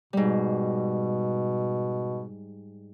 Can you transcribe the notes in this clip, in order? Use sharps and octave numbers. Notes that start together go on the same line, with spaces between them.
G#2 B2 G3